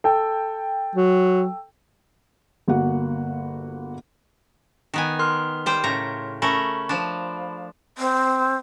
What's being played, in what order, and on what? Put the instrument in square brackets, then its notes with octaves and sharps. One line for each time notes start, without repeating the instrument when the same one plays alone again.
[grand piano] A4 G5
[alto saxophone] F#3
[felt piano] G1 A#3 F#4 F#5
[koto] D#3 B3 G#5
[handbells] A#4 C6 F6
[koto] G3 C5 G5
A2 C#3 A#5
[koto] A3 C#4 A#4 [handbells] B5
[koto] F3 D4
[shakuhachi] C4